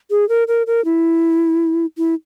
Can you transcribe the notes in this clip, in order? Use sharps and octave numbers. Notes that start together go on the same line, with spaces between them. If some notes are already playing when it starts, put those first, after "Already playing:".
G#4
A#4
A#4
A#4
E4
E4